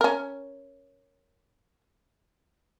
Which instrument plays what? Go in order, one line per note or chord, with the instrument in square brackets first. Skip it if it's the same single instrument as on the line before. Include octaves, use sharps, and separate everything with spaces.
[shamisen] C#4 A#4